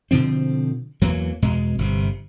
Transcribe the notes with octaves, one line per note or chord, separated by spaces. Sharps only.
B2 D3 F3 C4
E2 E3 F#3 A#3
E2 B2 G#3
G1 C3